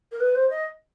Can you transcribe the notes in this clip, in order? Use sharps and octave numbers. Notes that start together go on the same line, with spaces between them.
A#4
B4
C5
D#5